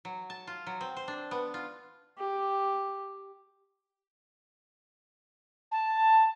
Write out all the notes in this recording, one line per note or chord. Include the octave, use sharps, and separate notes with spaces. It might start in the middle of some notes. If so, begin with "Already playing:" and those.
F#3
A5
F4
F#3
C4
C5
D4
B3
F4
G4
A5